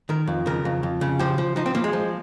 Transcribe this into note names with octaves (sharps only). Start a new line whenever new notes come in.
D#3 A#4
F2
C#3 A#4
F2
F2
C#3
F3 G4
F3
F3 D#4
C4
F3 A#3
G#3
F3